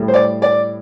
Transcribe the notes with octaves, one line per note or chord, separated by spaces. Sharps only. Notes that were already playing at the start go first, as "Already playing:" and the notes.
Already playing: A2 G3
C5
D5
D5